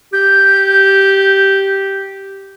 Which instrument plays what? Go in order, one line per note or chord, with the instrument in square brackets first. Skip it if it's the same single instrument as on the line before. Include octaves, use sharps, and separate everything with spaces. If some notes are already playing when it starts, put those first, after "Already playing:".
[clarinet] G4 [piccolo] G6